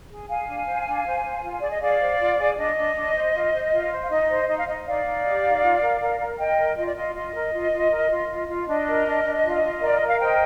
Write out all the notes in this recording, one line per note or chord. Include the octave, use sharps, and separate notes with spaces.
G#4
G#4 F5 G#5
D4
C5
D4
C5
C5
F4
G#4 D5
D#5
G#4 D5 F5
C5
F4
G#4
D4 D#5
D4
D4
C5
F4
C5
F4
C5
F5
D#4 D#5
C5
D#4 D#5
F5
D#4 D#5
D#4 D5 F5
D#4
G4
D#4
F4
A#4
A#4
A#4
A#4 D#5 G5
A#4
F4 D#5
D5
F4 D#5
F4 D#5
A#4
F4
F4
A#4
F4
F4
F4
D4 D#5
A#4
D4
D4
F4
F4
A#4 D5
D#5
A#4
F5
C5 D#5 G5